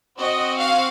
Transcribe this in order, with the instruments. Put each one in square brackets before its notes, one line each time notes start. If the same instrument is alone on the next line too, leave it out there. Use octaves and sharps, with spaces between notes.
[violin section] C4 F#4 D#5
F5